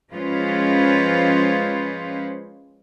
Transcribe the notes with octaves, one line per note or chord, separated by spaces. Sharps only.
F3 G#3 C#4 F4 B4 C5